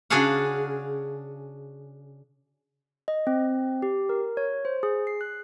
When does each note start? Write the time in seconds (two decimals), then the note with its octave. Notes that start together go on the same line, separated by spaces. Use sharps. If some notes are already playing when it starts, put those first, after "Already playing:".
0.10 C#3 D4 F#4 G#4 F5 F#5
3.08 D#5
3.27 C4
3.82 G4
4.09 A#4
4.37 C#5
4.65 C5
4.83 G#4
5.07 C7
5.21 F#6